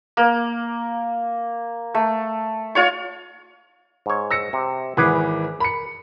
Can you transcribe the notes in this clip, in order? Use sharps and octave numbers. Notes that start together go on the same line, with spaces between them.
A#3
A3
F4 C#5 C#6
G#2 C#5
E6 A#6 C#7
C3
G#1 E3 G#4 B4 F#5 D6
A#4 B5 C#7